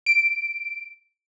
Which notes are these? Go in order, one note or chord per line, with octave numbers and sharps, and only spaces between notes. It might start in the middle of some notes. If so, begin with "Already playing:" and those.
D7